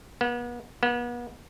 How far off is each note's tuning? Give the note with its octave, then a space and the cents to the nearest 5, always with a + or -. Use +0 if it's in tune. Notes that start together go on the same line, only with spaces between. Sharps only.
B3 -40
B3 -40